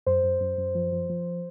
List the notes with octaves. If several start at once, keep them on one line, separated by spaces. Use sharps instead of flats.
F#2 C5
F#2
F#2
F#2
F3
F3
F3